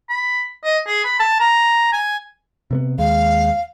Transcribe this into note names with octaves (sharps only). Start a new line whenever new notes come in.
B5
D#5
G#4
B5
A5
A#5
G#5
C3 A#3 B3
D#2 G#3 F5